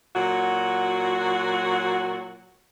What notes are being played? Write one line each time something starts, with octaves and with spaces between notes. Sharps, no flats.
A#2 F#3 F#4